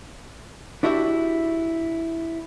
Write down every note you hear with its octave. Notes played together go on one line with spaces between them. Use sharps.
D4 E4 F#4 G4 E5